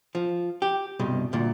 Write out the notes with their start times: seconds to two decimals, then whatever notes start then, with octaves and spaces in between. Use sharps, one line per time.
0.15 F3
0.62 G4
1.00 C2 G2 B2
1.33 D2 A#2